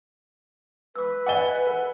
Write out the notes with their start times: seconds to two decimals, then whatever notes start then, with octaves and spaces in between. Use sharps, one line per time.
0.96 B4 D6 E6
1.26 D5 D#5 F#5 G#5 D6 G7
1.67 A#4